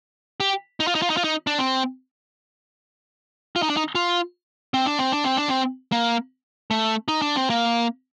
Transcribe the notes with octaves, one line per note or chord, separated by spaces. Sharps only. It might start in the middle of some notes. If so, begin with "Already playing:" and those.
G4
D#4
F4
D#4
F4
D#4
F4
D#4
D4
C4
F4
D#4
D4
D#4
F4
C4
D4
C4
D4
C4
D4
C4
A#3
A3
D#4
D4
C4
A#3